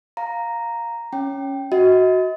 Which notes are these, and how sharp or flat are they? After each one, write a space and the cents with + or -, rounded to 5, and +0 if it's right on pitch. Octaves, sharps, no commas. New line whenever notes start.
F5 +5 A#5 +0
C#4 +0 G5 +0
F#4 +0 D#5 +35